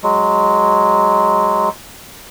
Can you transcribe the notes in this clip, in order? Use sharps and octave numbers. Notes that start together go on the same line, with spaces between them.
F#3 G#3